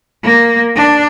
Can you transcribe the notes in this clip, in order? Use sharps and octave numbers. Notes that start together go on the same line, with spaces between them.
A#3
D4